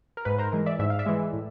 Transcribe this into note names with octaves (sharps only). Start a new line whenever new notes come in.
A#4
G#2 B4
A#4 C5
E3 G#3 A#4
D5 E5
G#2 E5
F5
D5 E5
E3 G#3
A2